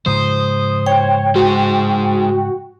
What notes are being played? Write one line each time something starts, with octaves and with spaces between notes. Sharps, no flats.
G#2 C#3 F3 C5 D#6
C#5 G5
G#3 F#4 C5